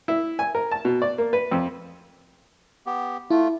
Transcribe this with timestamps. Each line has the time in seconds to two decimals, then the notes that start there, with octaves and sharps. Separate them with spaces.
0.08 E4
0.39 G#5
0.55 A#4
0.71 A5
0.85 B2
1.02 D5
1.18 A#3
1.33 B4
1.52 F2
2.86 B3 G4
3.31 A3 E4 F4